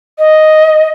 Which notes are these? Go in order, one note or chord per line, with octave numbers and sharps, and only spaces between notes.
D#5